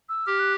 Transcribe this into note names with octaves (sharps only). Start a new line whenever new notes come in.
E6
G4 F6
F#6